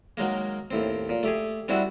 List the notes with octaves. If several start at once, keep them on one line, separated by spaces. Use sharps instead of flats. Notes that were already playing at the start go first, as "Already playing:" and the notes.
D#3 F#3 G#3 A#3
D#2 A2 C4
A#2
A3 G4 G#4
G3 C4 D4 E4 F#4